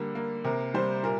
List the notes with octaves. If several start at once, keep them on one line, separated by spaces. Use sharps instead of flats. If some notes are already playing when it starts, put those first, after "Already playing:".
Already playing: D3 G3 A#3
A#3
C3 A#4
G3 C5
A#2 A#4